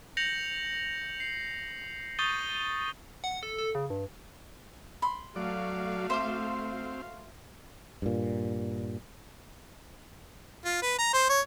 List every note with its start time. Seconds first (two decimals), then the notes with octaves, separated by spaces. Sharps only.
0.17 G6 A#6 C#7 F7 F#7
1.20 C7
2.19 C#6 D#6 G6 A6 D#7 G7
3.24 F#5
3.43 A4
3.58 A4
3.75 C#3
3.90 G2
5.02 B5 C6
5.36 F#3 A3 F#4 D5 F5
6.10 C4 C5 E5 C6 D6
8.02 G2 A#2
10.65 F4
10.82 B4
10.98 A#5
11.13 C5
11.29 C#5